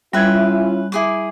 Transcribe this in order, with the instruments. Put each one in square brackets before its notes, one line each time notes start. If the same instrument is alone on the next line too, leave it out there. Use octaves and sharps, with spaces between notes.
[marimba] G3 G#6 [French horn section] C#4 E4 F4 [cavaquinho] B4 E5
[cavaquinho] E4 G#4 D6